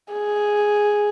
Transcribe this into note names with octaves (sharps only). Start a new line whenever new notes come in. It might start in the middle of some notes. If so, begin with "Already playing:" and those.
G#4